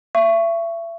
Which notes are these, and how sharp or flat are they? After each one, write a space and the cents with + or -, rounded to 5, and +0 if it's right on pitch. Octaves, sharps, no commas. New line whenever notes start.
E5 +30 C#6 +0